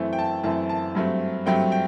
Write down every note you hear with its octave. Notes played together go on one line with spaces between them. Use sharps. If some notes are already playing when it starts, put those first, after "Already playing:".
Already playing: F#2 E3 A3 C4
G5
A5
F#2 E3 A3 C4 A5
A5
G2 F#3 A3 C4
G2 F#3 A3 C4 G5
G5